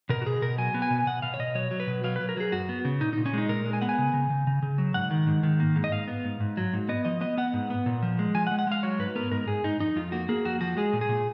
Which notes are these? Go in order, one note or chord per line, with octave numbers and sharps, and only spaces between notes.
B2 A#4
F#4
B2 G#4
B2 A#4
F#3 G#5
B3
G#5
B2
B2 F#5
B2 F5
C#5
B2 D#5
F#3 C#5
F#3
B4
B2
F#3 F5
F#3 B4
A#4
F#3 G#4
F#2 F#4
B3
C#3
A#2 D#4
A#2 D#4
C#4
G#3 D#4
A#2 A#4
G#3
G#5
B3 F#5
G#5
C#3
C#3
C#3
C#3
C#3
F#3
G#2 F#5
D#3
G#2
D#3
A#3
G#2
D#5
G#2 F5
B3
G#2
G#2
F#3
G#2
B3 D#5
F3 D#5
B3 D#5
B3 F#5
G#2
B3
A#2
F3
G#3
F3 G#5
F#5
G#3
F#5
G#3 F5
F#3 C#5
G#2 B4
B3 A#4
G#2 A#4
G#2 G#4
G#2 D#4
F2 D#4
F2 F4
A#3 F#4
A#3 G#4
F2 F#4
F3 F#4
G#3 G#4
A#2
G#4
A#2